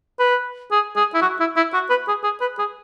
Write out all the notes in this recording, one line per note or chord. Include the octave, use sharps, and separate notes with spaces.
B4
G#4
G#4
E4
F#4
E4
E4
F#4
B4
G#4
G#4
B4
G#4